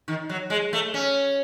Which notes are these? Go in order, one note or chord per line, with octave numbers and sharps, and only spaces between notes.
D#3
F#3
G#3
A3
C#4